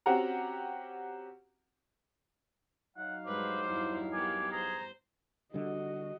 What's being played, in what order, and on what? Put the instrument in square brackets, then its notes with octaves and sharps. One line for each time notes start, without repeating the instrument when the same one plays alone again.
[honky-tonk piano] C4 C#4 F#4 G4 F#5 A#5
[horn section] F#3 D#4 F5 [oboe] F#5
[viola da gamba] G2 G#3 B4 [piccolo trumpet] C5 [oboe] D6
[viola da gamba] E2 G2 E4
[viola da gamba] B3 G4 A#4 [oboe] G#5 [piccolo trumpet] D6
[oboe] G#4 [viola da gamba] C5 [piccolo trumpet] A#5
[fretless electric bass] D3 G3 [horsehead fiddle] F#4 D#5